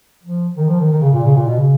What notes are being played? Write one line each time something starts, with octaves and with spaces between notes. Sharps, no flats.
F3
D#3
F3
D#3
D#3
C#3
A#2
C#3
A#2
B2
C#3